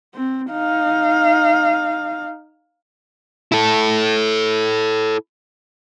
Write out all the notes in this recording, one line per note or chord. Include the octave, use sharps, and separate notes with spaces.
C4
D#4 F5
E4 A4